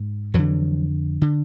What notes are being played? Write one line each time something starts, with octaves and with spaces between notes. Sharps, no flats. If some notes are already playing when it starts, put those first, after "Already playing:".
Already playing: G#2
F2 D3 E3 F#3
D3